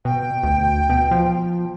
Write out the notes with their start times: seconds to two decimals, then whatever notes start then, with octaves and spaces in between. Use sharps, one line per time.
0.05 B2 G5
0.43 D2
0.90 B2
1.11 F3